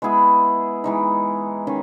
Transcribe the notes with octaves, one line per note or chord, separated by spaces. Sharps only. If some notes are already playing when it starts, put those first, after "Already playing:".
G#3 B3 E4 G#4
E3 G#3 D#4
D#3 C#4